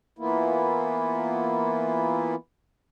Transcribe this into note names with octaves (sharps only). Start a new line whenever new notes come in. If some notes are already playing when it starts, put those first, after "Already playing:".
E3 A#3 B3 E4 F4